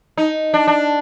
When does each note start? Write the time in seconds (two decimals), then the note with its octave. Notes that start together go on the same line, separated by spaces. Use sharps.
0.17 D#4
0.54 D4
0.67 D4